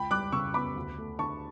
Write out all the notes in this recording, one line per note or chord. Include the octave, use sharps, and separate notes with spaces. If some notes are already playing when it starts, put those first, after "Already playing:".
Already playing: C#2 G5 B5
G3 D6 F#6
C#3 C#6 E6
B3 B5 D6
D2
A3
D3 A5 C#6